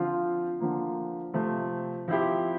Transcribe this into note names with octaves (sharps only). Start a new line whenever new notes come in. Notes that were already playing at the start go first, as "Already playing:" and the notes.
Already playing: D3 F3 C4 F4
D3 F3 A#3
C3 F3 A3 C4
F3 C4 E4 G4